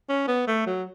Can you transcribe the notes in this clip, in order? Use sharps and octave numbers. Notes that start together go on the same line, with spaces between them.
C#4
B3
A3
F#3